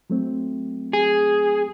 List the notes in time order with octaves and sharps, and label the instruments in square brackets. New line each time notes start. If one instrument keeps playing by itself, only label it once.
[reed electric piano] F#3 A3 C4
[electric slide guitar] G#4